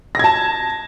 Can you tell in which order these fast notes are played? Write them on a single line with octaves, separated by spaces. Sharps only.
A#6 G#6 A5